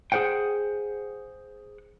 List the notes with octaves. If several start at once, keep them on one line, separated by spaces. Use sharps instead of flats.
G#4 B4 C5 F#5 G5